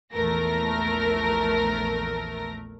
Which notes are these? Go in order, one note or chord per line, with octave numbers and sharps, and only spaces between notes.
A#1 E2 A3 A#4 A#6